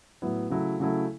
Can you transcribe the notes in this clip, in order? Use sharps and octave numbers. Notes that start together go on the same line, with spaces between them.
A2 F#3 B3 E4
C#3 F#3 A3 E4
C#3 F#3 A3 E4